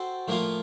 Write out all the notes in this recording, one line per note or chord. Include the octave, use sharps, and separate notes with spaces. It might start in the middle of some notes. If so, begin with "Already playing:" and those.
Already playing: C4 F#4 A4 C5
A2 F3 A#3 F4